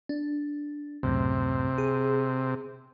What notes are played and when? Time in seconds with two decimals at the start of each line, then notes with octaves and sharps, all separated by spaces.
0.09 D4
1.03 C#2 F#2 A2 C3
1.78 G#4